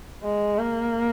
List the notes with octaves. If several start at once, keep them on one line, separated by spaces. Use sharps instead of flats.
G#3
A#3